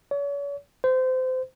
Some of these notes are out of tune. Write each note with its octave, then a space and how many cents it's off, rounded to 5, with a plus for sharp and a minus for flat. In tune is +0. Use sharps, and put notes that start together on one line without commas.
C#5 +40
C5 -25